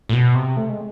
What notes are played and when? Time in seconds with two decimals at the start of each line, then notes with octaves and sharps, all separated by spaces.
0.09 A2
0.13 B2
0.35 C3
0.57 A3
0.69 G#3